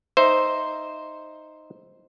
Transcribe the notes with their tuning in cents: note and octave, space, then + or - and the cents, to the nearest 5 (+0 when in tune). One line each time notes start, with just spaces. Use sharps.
D#4 +0 C5 +0 E5 +0